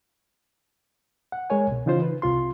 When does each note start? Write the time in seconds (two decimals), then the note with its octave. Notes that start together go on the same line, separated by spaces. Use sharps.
1.32 F#5
1.50 G#3 A#4 C#5 G#5
1.67 C2 B2
1.86 C#3 E3 D#4 F4 C5
2.02 B4
2.22 C2 C3 F4 C6